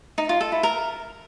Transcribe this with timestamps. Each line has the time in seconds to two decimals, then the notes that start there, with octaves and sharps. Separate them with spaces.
0.18 D#4
0.29 F4
0.41 A4
0.52 E4
0.63 A#4